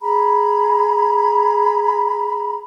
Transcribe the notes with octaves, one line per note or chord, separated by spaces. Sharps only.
G#4 A#5 B5